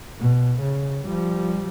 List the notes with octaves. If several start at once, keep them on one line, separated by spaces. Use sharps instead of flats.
B2
C#3
F3 G3